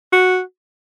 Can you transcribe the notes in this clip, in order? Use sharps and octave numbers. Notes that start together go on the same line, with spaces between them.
F#4